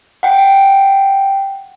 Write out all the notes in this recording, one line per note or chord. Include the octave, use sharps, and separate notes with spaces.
F#5 G5